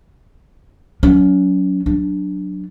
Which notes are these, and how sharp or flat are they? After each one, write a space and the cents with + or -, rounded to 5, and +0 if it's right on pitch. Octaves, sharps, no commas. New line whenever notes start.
F#3 +0 C#4 +35
F#3 +0 D4 -5